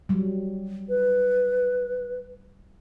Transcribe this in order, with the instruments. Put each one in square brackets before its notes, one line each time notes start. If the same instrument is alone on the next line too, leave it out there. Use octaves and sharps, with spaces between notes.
[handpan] F#3 G3
[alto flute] B4